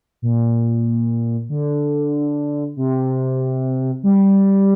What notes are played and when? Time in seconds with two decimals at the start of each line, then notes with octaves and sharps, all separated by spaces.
0.22 A#2
1.49 D3
2.77 C3
4.04 G3